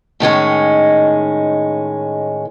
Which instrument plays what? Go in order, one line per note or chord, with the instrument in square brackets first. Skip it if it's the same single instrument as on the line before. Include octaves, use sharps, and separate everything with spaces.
[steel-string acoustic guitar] A2 D#3 G#3 C#4